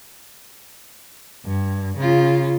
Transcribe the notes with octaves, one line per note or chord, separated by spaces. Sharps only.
G2
C#3 F4